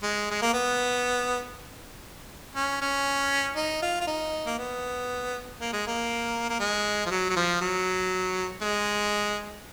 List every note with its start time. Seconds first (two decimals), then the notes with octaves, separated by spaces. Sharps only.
0.03 G#3
0.31 G#3
0.42 A#3
0.54 B3
2.56 C#4
2.82 C#4
3.56 D#4
3.82 F4
4.01 F4
4.07 D#4
4.46 A#3
4.58 B3
5.59 A#3
5.73 G#3
5.87 A#3
6.50 A#3
6.60 G#3
7.06 F3
7.11 F#3
7.30 F#3
7.36 F3
7.61 F#3
8.62 G#3